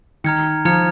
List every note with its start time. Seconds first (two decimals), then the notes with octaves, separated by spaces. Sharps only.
0.24 D#3 A#5 F6 G#6 C#7
0.65 F3 A#5 F6 G#6 C#7